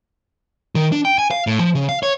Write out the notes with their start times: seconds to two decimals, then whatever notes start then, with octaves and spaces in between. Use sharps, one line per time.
0.75 D#3
0.92 D4
1.05 G5
1.19 G#5
1.31 F5
1.47 A2
1.59 F3
1.75 C#3
1.89 F5
2.03 C#5